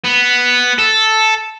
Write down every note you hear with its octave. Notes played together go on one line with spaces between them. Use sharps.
B3
A4